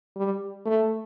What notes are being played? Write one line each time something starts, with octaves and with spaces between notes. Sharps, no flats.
G3
A3